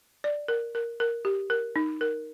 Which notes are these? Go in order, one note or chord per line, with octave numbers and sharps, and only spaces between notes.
D5
A#4
A#4
A#4
G4
A#4
D#4
A#4